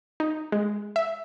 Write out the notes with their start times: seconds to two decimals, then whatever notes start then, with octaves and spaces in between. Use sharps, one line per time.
0.20 D#4
0.52 G#3
0.96 E5